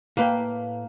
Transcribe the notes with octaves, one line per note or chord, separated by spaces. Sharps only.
A2 A#3 B4 G5